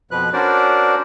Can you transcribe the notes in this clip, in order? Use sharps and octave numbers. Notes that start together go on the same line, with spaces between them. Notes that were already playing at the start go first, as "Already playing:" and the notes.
F2 B2 F3 B4 F#6
C#4 D4 F#4 A#4 C5 D5